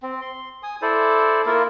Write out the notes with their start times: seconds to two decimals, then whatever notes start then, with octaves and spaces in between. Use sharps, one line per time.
0.02 C4
0.21 C6
0.63 G#5 D#6
0.82 E4 A4 C5 D5
1.46 A#3 E4 F4 A#4